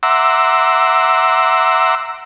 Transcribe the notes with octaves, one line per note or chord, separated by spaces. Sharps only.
E5 F#5 A#5 C6 D6 E6